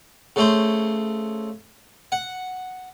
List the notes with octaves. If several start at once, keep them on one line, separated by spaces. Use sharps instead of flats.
C#3 A3 C5
F#5